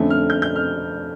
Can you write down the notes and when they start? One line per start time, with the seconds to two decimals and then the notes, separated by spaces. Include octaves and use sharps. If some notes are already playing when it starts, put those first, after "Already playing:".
Already playing: F2 D3 A3 C#4
0.10 F6
0.30 G6
0.42 G6
0.56 F6